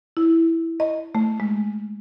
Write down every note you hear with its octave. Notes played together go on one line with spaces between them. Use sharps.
E4
D#5
A3
G#3